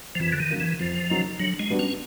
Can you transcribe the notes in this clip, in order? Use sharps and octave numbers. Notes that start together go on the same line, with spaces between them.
F3
F2 E3
D3
D#3
C#3 F#3 A#3 D#4
E3
F2 F3
C#3 F#3 A#3 D#4
D3 F#3
G#3
G3 B3 D4 F#4
C#4